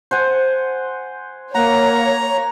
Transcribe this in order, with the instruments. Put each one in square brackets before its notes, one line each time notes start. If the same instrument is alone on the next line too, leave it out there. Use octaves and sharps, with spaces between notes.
[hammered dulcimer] C5 F#5 G#5
[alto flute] A#3 [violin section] C#5 [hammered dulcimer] F#5 [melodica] A#5